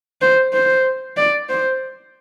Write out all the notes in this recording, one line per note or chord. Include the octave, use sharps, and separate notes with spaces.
C5
C5
D5
C5